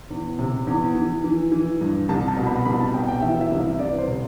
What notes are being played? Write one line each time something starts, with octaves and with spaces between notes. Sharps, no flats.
E2
C3
E2
E3
E3
E3
G2
C2 A5
A5
B2
B5
C2 B5
A5
B2 G5
G5
E3 E5
E5
C2
E5
C2 D5
B4
C5
C3